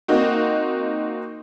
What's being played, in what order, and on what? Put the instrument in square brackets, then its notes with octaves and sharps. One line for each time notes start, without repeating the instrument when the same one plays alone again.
[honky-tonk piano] A#3 C4 D#4 F#4